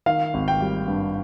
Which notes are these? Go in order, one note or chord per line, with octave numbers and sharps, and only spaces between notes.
D#3 F5
G#1
G5
G3
G2